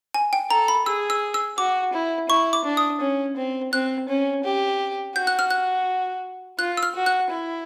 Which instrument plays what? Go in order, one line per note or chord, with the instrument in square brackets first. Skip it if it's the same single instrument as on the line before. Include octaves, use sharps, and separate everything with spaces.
[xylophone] G#5
G5
[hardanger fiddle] A4 [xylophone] A#5
[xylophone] B5
[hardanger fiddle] G#4 [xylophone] E6
[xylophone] E6
E6
[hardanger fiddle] F#4 [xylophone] D6
[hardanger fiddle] E4
[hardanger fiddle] E4 [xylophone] C#6
[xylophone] D6
[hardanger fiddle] D4
[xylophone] D#6
[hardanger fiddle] C#4
C4
[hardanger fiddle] C4 [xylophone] F#6
[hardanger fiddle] C#4
G4
[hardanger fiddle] F#4 [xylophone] G6
[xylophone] F#6
F6
F#6
[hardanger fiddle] F4 [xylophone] F#6
[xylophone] E6
F6
[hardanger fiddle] F#4
[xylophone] F#6
[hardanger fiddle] E4